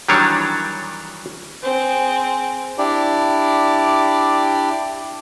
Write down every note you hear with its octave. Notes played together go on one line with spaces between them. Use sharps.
D#3 E3 F#3 G3 D4 C#5
C4 G#4
D4 E4 G4 D5